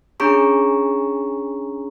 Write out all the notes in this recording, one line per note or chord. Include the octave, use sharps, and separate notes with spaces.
C#4 D4 G#4 A#5 C#6